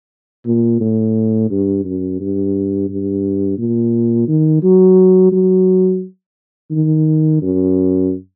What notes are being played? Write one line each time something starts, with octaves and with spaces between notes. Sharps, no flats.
A#2
A2
G2
F#2
G2
G2
A#2
D#3
F#3
F#3
D#3
F#2